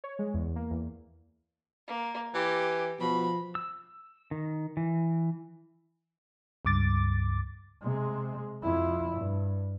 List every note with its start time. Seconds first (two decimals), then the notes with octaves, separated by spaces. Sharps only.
0.04 C#5
0.19 G#3
0.34 E2
0.56 A#3
0.71 E2
1.88 A#3
2.34 E3 G4
3.00 B2 F3 B5
3.55 E6
4.31 D#3
4.77 E3
6.65 C#2 G2 D6 A6
7.82 C3 G#3
8.63 F2 E4
9.16 G2